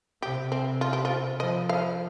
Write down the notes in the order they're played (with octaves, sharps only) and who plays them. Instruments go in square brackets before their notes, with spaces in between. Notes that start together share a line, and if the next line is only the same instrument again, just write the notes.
[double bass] C3 [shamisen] G4
[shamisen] C4
F4
G4
F4
[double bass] F3 [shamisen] D#5
[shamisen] F5